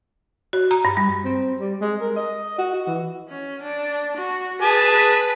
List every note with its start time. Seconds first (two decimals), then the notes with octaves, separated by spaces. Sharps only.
0.53 F#4
0.71 A#5
0.85 G2
0.97 G3
1.24 C4
1.60 G3
1.81 G#3
2.01 A#4
2.16 D#5
2.59 F#4
2.73 F#4
2.87 E3
3.29 C#4
3.62 D4
4.17 F#4
4.61 G#4 B4 A5